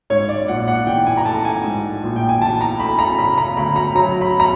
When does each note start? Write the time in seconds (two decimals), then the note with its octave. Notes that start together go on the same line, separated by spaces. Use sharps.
0.10 G#2 C#5
0.29 D5
0.48 A#1 F#5
0.68 F#5
0.87 E3 G5
1.07 G#5
1.17 A#5
1.26 A3 A5
1.45 G#5
1.64 G#2
2.03 A#1
2.16 G5
2.29 G#5
2.41 E3 A5
2.61 A#5
2.79 A3 B5
2.99 A#5
3.19 C#3 B5
3.38 A#5
3.57 D2 B5
3.76 A#5
3.95 F#3 A#5
4.21 B5
4.40 A#5